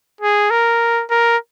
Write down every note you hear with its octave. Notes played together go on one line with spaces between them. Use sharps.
G#4
A#4
A#4